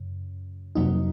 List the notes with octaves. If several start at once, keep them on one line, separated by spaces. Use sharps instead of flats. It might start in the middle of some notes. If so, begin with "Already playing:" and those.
Already playing: F#2 C#3
F2 C3 F#3 A#3 D#4